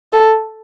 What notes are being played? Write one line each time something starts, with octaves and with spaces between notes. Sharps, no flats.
A4